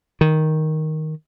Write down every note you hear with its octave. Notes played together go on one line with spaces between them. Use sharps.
D#3